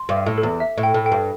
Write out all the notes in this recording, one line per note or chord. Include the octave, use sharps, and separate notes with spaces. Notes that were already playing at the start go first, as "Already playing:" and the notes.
Already playing: C6
G2
E5
A2
A4
E2
E5
A2
G5
A2
G5
G2